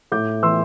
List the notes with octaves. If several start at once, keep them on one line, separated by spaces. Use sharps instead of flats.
A2 D6 G6
E3 C6 E6